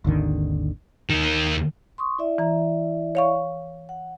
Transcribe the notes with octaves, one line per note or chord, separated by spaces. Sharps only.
G#1 D#2 D3 D#3
D#2 D#3
C6 C#6 D#6
E4 D5 E5
E3 A#5
C#5 F5 C#6
F#5